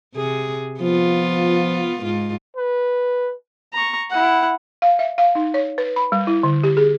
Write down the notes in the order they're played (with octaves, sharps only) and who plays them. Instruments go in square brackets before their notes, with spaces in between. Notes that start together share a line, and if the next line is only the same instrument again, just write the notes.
[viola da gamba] C3 G#4
[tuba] F3 [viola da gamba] B3 F4
[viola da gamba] G#2 F4
[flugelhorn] B4
[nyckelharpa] A#5 C#6
E4 F#5
[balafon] F5
E5
F5
D#4
C#5
B4
B5
G3
E4
D3
G4
G#4